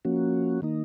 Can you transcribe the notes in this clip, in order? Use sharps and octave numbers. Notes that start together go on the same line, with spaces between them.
F3 A#3 C#4 F#4
D#3 A#3 D#4